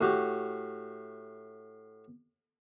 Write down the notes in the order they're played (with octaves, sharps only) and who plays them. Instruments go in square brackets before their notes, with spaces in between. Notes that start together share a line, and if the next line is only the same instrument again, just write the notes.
[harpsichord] A2 F#4 G4